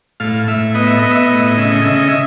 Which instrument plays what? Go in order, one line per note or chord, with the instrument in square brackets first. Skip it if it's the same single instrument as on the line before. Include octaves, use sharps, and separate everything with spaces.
[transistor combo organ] A2 F5
A2 E5
B3 D#5
E5
B3 D#5
E5
D#5
A2 E5
D#5
C#3 E5
D#5
C#3 E5
D#5
E5